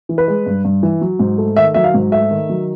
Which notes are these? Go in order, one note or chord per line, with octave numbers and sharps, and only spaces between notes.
E3
B4
G#3
G2
G2
E3
F#3
G#2
A3
D#3 E5
F#3 E5
F5
G#2
A3 E5
D#3
F#3